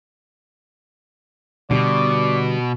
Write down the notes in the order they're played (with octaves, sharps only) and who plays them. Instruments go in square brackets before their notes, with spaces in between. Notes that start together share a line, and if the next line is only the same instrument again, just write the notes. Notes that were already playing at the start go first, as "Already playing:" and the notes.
[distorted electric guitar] B2 [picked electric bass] D3 G3 [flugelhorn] D5